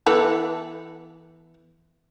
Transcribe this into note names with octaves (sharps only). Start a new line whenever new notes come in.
E3 B3 A4